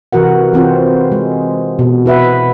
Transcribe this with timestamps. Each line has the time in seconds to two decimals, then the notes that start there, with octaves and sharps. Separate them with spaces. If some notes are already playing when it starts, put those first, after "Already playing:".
0.13 C3 E3 F#4 A#4 F#5
0.53 E3 C4 F4 C5
1.12 G#3
1.79 B2
2.06 E4 B4 E5 F#5